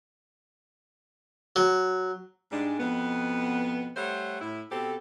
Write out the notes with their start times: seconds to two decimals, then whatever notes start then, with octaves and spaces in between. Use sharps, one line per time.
1.56 F#3
2.52 G#2 G3 G#3 D4
2.79 F2 B2 B3
3.96 G3 A3 C5 C#5 F#5
4.41 A2 E4
4.71 B2 C4 G4 A4